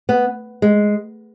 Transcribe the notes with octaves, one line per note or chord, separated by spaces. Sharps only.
B3
G#3